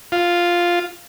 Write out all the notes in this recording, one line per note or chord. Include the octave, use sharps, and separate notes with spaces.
F4